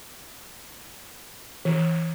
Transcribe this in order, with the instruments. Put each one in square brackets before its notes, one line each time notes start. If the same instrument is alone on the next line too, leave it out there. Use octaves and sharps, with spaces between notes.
[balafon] E3